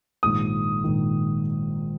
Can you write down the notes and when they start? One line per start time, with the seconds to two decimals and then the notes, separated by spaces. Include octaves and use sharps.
0.23 A#1 G#2 D#3 D#6
0.84 A#1 G#2 D#3